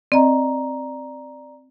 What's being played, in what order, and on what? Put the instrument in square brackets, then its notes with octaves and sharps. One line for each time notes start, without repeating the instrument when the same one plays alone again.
[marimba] C4 D#5 [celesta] D5 A#5